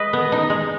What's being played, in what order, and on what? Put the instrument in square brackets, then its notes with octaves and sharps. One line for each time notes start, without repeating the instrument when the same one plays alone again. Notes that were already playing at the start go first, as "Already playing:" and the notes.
Already playing: [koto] G#3 B4 [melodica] D#5
[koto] B3
D#4
G#3